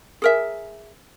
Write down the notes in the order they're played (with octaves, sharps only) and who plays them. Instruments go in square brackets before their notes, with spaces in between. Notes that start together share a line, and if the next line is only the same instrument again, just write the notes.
[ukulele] G#4 A#4 E5